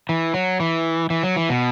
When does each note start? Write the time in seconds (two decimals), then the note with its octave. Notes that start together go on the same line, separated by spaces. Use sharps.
0.09 E3
0.34 F#3
0.60 E3
1.10 E3
1.23 F#3
1.36 E3
1.49 B2